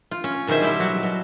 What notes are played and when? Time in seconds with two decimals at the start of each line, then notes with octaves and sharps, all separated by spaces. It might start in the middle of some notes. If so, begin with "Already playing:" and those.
0.11 F4
0.24 C#4
0.47 B2 D#3 G#4 C5 E5
0.62 G3 E4
0.80 F#3 F#4
1.03 B2